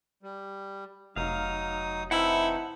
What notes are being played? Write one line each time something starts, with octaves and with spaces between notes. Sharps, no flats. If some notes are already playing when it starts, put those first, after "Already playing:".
G3
F1 F#3 D#4 F5 D#6
E3 C4 D#4 E4 F#5 A5 E6